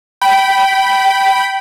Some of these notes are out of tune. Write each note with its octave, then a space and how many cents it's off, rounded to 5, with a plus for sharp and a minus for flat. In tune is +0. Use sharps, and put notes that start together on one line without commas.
G5 -15 B5 +0